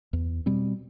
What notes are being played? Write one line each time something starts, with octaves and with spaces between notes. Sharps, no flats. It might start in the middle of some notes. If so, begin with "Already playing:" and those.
E2
B2 G3 C4